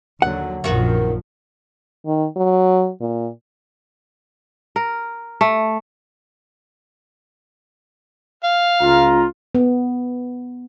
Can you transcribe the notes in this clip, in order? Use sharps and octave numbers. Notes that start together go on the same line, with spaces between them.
D#2 D3 F#3 F#5
A#1 F#2 D#3 F3 F#4
D#3
F#3
A#2
A#4
A3
F5
C#2 F4 A#5
B3